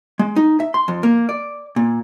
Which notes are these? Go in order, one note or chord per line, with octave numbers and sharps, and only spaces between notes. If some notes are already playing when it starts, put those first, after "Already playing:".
G#3
D#4
E5
C6
F2
A#3
D5
A#2